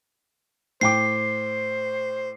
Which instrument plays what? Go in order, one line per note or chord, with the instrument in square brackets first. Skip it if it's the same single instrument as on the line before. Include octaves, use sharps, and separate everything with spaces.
[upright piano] A2 G5 D6 [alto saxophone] C5 [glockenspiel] C7